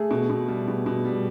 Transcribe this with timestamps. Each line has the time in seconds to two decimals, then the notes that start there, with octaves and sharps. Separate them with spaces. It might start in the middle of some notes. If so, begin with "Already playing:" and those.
Already playing: A3 G#4
0.11 B2
0.30 B2
0.48 G3
0.68 B2
0.86 B2
1.05 G3